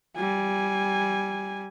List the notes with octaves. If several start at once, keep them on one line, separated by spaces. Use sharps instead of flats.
G3 G#5